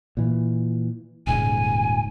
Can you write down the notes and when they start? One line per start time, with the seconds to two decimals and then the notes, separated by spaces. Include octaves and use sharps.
0.17 A#2 E3
1.27 D#1 G#2 C#3 G#5